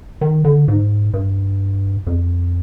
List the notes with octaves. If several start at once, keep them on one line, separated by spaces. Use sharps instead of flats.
D#3
D3
G#2
G2
F2